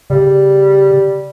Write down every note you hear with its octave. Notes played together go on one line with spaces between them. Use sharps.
C#3 G3